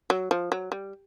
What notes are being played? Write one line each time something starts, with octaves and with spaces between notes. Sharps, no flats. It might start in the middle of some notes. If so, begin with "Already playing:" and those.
F#3
F3
F#3
G3